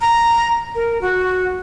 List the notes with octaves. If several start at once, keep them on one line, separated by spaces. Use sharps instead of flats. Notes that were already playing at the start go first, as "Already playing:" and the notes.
A#5
A#4
F#4